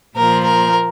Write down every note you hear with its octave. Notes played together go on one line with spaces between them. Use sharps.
A#2 F3 A#4
A#4